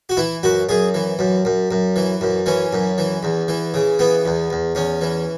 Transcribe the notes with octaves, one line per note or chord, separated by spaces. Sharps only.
F#4
E3 E4
F#2 F#4
F#2 G#4
E3
F#2
F#2
F#2
E3
F#2
E3 C#4
F#2
E3
E2
E3
C#3
E3 B3
E2
E2
E2 C#4
E3